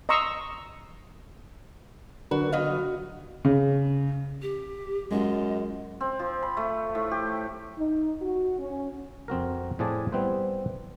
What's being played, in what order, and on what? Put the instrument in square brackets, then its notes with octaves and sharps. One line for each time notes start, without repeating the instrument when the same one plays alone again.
[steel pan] D#5 A#5 C6 C#6 E6
[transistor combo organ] D3 F#3 [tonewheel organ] D4 A#4 B4 [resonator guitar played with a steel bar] F#4
[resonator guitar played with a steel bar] B3 D#5 F5 [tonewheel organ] F#4
[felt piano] C#3
[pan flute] G4
[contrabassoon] F#2 [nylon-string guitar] G#3 F4 [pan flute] D#5
[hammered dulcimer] C4
F3
B5
A3
A2
G4
[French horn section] D#4
F#4
C#4
[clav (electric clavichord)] F2 C4 F#4 A#4
A2 F3 C4 G#4 D5 A5
G3 B3 C4 E4 B4 C5